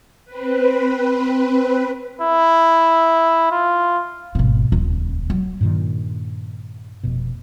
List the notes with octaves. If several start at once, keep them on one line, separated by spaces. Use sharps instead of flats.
C4 B4
E4
F4
G#1 B2
D#1 C#2
F#3
G2 A#2 D#3
F1 B2